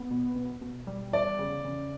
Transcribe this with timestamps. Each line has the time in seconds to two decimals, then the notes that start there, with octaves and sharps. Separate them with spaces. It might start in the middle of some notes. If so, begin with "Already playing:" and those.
Already playing: B3
0.11 B2
0.36 B2
0.61 B2
0.87 G3
1.13 E2 D5
1.39 C#3
1.65 C#3